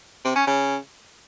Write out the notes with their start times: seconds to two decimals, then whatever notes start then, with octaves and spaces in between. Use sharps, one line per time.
0.25 C3
0.36 C#4
0.47 C#3